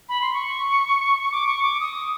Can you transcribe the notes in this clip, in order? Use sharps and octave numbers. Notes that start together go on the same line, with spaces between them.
B5
C6
C#6
D6
C#6
D6
D#6